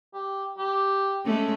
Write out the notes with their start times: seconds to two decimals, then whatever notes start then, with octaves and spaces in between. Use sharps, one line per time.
0.14 G4
0.58 G4
1.25 G#3 A3 C#4